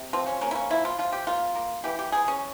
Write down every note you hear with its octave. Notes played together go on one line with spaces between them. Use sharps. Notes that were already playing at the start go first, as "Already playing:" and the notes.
Already playing: C3
F3 C4
C#4
A#3 C#4
E4
C#4
F3 E4
F4
F3 F4
G4
A#3 F4
A#3
E3 G4
G4
E3 G#4
C#4